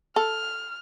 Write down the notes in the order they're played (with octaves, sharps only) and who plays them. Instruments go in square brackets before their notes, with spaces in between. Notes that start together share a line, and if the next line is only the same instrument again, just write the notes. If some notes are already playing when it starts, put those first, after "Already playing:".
[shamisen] A4 [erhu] F6